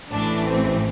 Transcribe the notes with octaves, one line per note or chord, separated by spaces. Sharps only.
A1 A2 E3 A3 D4
C4